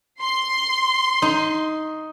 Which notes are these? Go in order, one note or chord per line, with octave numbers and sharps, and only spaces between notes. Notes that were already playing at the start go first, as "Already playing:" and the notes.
C6
D#4